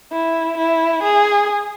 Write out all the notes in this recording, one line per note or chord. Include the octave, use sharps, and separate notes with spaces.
E4
E4
G#4